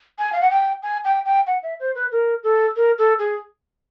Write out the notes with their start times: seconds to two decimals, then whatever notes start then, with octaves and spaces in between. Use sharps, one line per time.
0.19 G#5
0.33 F5
0.41 F#5
0.50 G5
0.83 G#5
1.05 G5
1.26 G5
1.47 F#5
1.63 E5
1.80 C5
1.95 B4
2.12 A#4
2.44 A4
2.76 A#4
2.98 A4
3.19 G#4